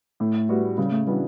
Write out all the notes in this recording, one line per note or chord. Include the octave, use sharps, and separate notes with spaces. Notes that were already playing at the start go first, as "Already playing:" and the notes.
A2 A3
G3 B3 F#4
C#3 G3
A3
E3 G3 B3 D4 F#4